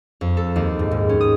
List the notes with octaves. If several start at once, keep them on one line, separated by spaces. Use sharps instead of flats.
F2
A4
D#2
G#2
G#2
C#4
D#6